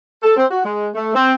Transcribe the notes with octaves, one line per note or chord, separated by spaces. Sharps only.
A4
C4
F#4
G#3
A3
C4